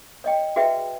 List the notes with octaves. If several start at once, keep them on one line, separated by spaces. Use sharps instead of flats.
C#5 D#5 G5
F#4 G#4 B4 E5 G5